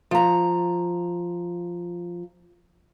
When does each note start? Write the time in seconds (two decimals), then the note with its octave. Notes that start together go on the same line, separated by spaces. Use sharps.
0.11 F3 A#5